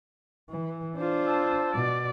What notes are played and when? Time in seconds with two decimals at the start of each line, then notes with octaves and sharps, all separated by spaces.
0.50 E3
0.98 D4 F4 C5
1.27 A5 E6
1.75 B2 D5